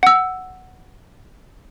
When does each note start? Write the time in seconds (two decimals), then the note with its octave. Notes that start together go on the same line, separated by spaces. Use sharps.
0.03 F#5 E6